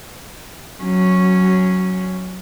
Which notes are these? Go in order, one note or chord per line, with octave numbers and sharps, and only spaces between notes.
F#3 C#4